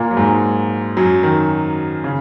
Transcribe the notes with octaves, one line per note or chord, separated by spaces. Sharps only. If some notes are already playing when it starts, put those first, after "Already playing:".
Already playing: A#2 A#3
F#3
G#2 G#3
F#2 F#3
D#3
C#3